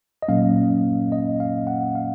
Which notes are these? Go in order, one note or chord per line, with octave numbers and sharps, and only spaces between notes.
D#5
A#2 F#3 A#3 C#4 F5
D#5
F5
F#5
F5